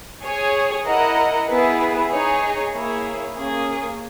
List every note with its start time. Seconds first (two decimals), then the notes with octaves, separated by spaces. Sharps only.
0.23 G#4 C#5 G#5
0.85 E4 A#4 D#5 F#5
1.47 B3 E4 G#4 B4
2.10 D#4 G#4 C#5 G#5
2.72 A#3 E4 G#4 C#5
3.35 A#3 C#4 G#4